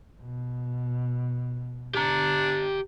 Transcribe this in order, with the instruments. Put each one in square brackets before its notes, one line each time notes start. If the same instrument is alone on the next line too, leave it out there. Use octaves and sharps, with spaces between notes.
[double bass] B2
[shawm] D4 [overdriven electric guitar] G4 A#5